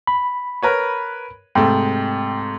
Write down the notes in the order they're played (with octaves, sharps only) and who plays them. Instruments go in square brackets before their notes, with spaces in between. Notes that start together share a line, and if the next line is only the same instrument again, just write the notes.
[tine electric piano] B5
[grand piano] A#4 B4 C#5
[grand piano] G#2 C3 A3 [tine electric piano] G5